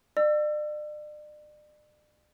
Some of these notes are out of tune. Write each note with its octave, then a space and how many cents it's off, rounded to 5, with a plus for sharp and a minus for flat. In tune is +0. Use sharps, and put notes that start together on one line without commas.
D5 +40 E6 +30